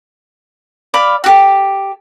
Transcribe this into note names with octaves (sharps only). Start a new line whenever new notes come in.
D5 F5 B5
F#4 G4 A4